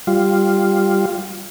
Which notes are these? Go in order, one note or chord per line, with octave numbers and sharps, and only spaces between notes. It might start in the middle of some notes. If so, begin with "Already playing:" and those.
G3 F4